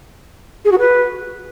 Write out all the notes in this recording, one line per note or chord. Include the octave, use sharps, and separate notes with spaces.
G#4
F#4
B4